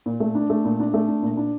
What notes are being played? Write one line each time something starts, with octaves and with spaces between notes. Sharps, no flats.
A#2
A3
D4
A3
A#2
D4
A3
D4
A#2
D4